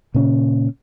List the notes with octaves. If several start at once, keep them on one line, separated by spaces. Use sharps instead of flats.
A#2 C#3 C#4